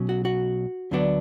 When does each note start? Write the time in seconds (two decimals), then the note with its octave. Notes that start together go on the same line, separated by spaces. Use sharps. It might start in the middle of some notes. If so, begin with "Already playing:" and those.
Already playing: B1 B2 F#3 C#4
0.09 F#4
0.25 F#4
0.91 D2 D3 F#3 B3 D4